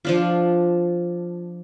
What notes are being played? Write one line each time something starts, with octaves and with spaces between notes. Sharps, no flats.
F3 D4 F4